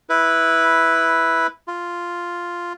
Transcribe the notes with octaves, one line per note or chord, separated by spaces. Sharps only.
E4 B4
F4